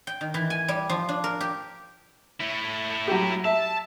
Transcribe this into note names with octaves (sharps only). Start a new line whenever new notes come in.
G5
D#3
E3
G#5
G3
F3
D4
A#4
G4
A3 E4
F#3 G4
E5 A5